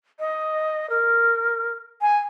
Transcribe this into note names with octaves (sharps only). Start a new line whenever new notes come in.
D#5
A#4
G#5